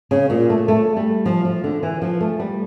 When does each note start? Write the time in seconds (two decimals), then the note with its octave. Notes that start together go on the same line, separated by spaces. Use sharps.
0.11 C#3
0.30 A#2
0.50 A3
0.68 A3
0.97 G3
1.26 F3
1.45 F3
1.64 D3
1.83 E3
2.02 F3
2.21 A3
2.40 G3